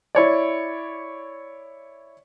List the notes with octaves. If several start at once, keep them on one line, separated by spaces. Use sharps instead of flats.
E4 C#5 D5